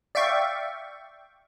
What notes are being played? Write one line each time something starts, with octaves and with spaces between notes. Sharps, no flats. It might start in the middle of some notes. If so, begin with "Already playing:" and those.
D5 E5 F5 G5 C#6